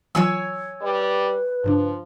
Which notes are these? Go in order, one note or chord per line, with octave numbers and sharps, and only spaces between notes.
E3 F#3 F4 C#5 G#5 E6
G3 B4
G2 C#3 F3 D4